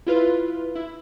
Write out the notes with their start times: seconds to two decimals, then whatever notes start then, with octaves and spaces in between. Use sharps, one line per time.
0.07 E4 F4 B4
0.75 E4